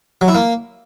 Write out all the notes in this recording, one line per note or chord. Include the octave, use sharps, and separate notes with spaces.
F#3
E4
A#3